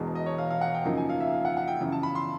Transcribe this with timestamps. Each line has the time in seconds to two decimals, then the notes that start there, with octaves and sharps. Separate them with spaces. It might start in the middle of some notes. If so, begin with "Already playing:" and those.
Already playing: E1 E2 B2 G#3
0.15 D#5
0.26 C#5
0.38 F5
0.50 F5
0.61 F#5
0.74 G5
0.85 F#2 C#3 F3 A#3 D#4
0.97 G#5
1.09 F5
1.20 E5
1.33 F5
1.45 F#5
1.57 F#5
1.68 G5
1.80 F#2 C#3 E3
1.92 A5
2.03 B5
2.15 C6